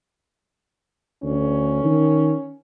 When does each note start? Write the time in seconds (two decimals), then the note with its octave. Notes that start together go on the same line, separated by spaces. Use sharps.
1.23 D2 C#4
1.84 D#3